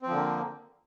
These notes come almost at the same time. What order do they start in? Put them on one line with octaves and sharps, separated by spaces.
C4 F3 D3 A#3